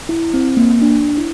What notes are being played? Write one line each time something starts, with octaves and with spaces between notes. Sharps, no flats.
E4
C4
A#3
D4
E4